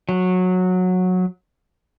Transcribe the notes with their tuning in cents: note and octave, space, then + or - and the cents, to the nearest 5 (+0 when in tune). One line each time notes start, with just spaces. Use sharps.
F#3 -15